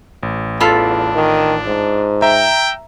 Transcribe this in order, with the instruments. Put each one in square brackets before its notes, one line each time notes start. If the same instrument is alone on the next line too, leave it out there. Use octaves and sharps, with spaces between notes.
[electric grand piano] A1
[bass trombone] E2 [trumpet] D4 [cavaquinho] F4 A4 B5
[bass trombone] D#3
G#2
[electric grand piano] E5 A#5 [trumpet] G5